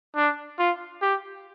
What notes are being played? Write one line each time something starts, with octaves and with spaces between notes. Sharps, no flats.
D4
F4
G4